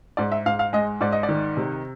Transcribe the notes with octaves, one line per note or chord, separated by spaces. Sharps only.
G#2 D5
E5
G#2 F5
F5
G#3 D#5
G#2 D5
D#5
D5
D#3
C3